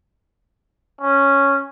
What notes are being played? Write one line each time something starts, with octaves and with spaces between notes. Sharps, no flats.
C#4